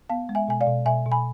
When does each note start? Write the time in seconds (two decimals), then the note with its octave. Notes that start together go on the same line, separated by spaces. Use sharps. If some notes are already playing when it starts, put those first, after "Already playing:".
0.09 B3 F5 A5
0.29 G#3
0.35 E5 G#5
0.48 B2 G#5
0.61 D5 F5
0.67 B2
0.86 B2 E5 G#5
1.06 B2
1.12 G#5 B5